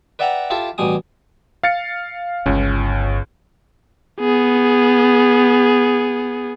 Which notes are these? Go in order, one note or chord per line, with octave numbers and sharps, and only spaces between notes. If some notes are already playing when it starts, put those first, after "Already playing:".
B4 D5 E5 F#5 G5 A#5
E4 F4 G4 A4 E5
A1 B2 G3 G#5 D#6
F5 A6 C#7
G1 C#2 C#4
B3 G#4